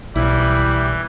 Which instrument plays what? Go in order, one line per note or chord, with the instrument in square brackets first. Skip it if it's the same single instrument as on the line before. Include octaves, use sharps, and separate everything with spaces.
[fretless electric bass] B1 [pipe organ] E3 [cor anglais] G3 [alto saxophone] E4